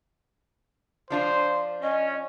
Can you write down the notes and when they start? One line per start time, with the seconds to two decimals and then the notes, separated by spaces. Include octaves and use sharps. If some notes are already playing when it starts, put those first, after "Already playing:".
1.10 F3 D4 F4 C5
1.83 C#4 D#5